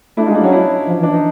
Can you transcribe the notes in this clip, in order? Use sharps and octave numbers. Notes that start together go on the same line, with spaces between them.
A3 D4 E4
G#3 D#4 F4
D4 E4
F#3 C#4 D#4
D4 E4
F3
E3
D4
E3
D#4